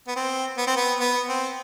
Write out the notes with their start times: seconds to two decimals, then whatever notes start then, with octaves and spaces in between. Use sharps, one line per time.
0.07 B3
0.16 C4
0.58 B3
0.67 C4
0.76 B3
1.00 B3
1.28 C4